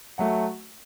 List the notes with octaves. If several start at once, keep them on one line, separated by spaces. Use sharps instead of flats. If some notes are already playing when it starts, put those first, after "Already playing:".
F#3 A3 F#5